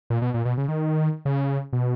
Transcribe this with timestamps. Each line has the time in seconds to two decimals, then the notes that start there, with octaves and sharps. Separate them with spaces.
0.10 A#2
0.22 B2
0.34 A#2
0.45 B2
0.58 C#3
0.68 D#3
1.25 C#3
1.73 B2